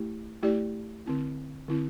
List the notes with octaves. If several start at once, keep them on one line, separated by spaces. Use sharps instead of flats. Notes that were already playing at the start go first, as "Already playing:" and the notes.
Already playing: A3 E4 G4
A3 E4 G4 D5
D3 C4 E4
D3 C4 E4